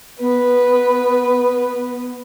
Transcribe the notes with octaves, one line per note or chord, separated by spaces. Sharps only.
B3 B4